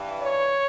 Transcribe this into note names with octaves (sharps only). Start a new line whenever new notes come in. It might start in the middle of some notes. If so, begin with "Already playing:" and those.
Already playing: G2 E3
C#5